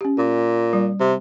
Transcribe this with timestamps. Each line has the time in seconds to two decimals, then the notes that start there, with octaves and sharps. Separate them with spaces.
0.01 C#4 G4
0.18 A#2
0.73 G3
1.00 C3